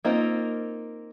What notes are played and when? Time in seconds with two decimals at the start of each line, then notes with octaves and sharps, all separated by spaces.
0.05 A#3 C4 D#4 F4